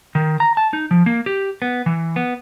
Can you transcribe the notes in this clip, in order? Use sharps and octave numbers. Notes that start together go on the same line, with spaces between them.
D#3
A#5
A5
D#4
F3
A#3
G4
B3
E3
B3